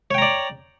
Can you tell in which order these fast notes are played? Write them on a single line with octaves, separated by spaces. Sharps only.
C#5 G5 A#5 D5